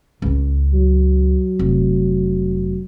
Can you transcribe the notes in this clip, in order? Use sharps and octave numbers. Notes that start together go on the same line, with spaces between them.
C#2 C#4
F#3
F1